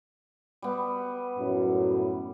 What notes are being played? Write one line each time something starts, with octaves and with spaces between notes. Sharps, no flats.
G3 B3
F#2 A2